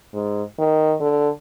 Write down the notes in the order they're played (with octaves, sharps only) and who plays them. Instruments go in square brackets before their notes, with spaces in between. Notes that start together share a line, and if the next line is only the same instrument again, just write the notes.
[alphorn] G#2
D#3
D3